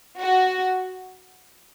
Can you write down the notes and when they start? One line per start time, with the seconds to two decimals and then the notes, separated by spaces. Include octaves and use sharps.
0.20 F#4